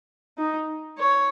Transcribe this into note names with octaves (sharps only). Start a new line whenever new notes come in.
D#4
C#5